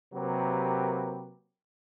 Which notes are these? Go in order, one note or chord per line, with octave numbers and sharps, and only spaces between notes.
C3 F#3 A#3 G4 A#4 B4